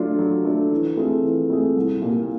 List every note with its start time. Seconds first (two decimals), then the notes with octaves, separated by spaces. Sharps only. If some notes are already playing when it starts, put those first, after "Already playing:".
Already playing: F#3 A3 D4 F4
0.19 F#3
0.45 A3 D4 F4
0.72 E3
0.97 A3 C4 F4 G#4
1.23 E3
1.50 A3 C4 F4 G#4
1.76 C2
2.02 A#2 G3 A#3